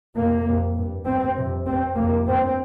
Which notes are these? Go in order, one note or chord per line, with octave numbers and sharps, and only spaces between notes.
F2 C3 A#3
F2 C3
G2
G2 C4
F2 C3
G2 C4
F2 C3 A#3
G2 C4